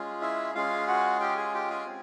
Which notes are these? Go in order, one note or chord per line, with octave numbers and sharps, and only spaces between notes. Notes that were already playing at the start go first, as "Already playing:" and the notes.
Already playing: G#3 C#4 F4 G#4
E4 E5
G#3 C#4 F4 G#4 F5
F#4 F#5
G4 G5
G#4 G#5
G4 G5
G#4 G#5
C4